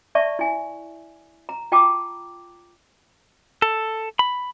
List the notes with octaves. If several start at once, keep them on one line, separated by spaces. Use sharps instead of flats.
D5 E5 A5 C#6
E4 G#5
A#5
F4 G5 A5 A#5 D6
A4
B5